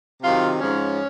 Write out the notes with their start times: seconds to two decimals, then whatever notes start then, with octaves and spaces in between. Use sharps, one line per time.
0.23 C3 D#3 F#3 F4
0.60 G#2 F3 C#4